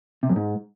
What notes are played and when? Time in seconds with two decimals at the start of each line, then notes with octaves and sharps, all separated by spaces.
0.23 C3
0.29 F#2
0.36 G#2